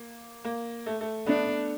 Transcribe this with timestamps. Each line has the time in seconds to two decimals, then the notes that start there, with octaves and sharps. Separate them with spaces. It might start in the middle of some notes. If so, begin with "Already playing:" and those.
Already playing: A#3
0.45 A#3
0.86 A3
1.01 A3
1.26 A3 B3 D4